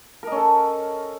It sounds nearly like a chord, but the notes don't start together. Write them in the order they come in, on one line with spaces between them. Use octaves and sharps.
A#4 D#5 C#4 A4